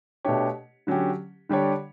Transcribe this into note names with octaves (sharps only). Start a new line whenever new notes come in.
B2 A3 D4 G4 C#5
D3 F#3 C#4 G4
D3 G3 D4 G4 C#5